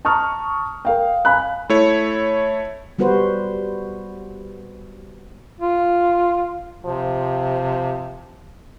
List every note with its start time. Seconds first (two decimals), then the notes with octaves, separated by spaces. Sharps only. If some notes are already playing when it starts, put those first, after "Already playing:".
0.05 A5 A#5 C#6 D#6 F6
0.85 A#4 F5 G5
1.25 F5 G#5 B5 F#6
1.70 A3 E4 C#5
2.98 G3 B3 F#4 B4 C5
5.60 F4
6.85 C3 F3